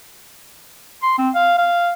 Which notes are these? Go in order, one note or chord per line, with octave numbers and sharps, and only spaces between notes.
C6
C4
F5
F5